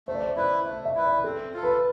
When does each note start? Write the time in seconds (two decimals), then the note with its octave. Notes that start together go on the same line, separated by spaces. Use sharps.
0.07 A3 C5
0.15 D5
0.22 C5
0.36 E4 B4 D5
0.66 A3 E5
0.85 E5
0.95 E4 B4
1.05 D5
1.24 C4 A4
1.54 F4 A4
1.63 B4